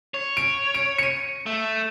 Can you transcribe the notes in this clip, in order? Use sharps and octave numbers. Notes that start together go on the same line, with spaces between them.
C#5
D7
D7
C#7 D#7
A3